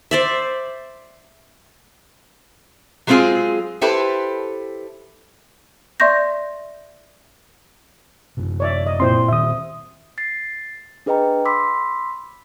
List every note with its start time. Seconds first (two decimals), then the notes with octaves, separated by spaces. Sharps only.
0.11 C5 D5 E5
3.07 F#3 G#3 B3 C4 F4 G#4
3.81 E4 G4 A4 B4 C5
6.00 D5 E5 C6 C#6 G6 A#6
8.37 F#2 C3
8.60 C#5 D5 E5
8.86 D#5
9.00 A#2 C4 E4 C5 C6
9.28 A#2 D#3 E5 D#6
10.18 A6 C7
11.06 D4 G#4 B4 D#5 G5 A#5
11.45 B5 C6 D6 E6 B6